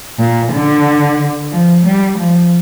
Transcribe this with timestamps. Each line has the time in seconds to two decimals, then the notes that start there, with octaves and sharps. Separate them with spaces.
0.19 A#2
0.52 D3
1.51 F3
1.85 G3
2.18 F3